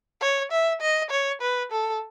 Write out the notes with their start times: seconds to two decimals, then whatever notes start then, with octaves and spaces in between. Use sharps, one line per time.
0.21 C#5
0.52 E5
0.81 D#5
1.11 C#5
1.41 B4
1.72 A4